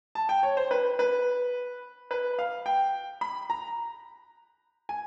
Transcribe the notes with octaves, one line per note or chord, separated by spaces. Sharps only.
A5
G5
C#5
C5
B4
B4
B4
F5
G5
B5
A#5
G#5